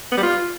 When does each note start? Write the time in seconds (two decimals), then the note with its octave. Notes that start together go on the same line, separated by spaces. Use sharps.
0.12 B3
0.17 G3
0.23 F4